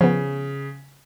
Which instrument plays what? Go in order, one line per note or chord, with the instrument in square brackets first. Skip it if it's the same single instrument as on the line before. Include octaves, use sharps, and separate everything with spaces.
[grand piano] C#3 [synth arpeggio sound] F3 B3